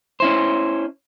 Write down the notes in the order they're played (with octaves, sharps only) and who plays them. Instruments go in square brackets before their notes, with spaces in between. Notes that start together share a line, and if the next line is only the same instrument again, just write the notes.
[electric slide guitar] C#4 E4 C5